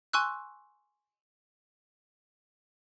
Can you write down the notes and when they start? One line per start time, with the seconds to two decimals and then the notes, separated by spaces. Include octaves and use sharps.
0.13 G#5 C6 C#6 E6 F#6